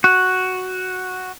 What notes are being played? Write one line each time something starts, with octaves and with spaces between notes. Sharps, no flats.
F#4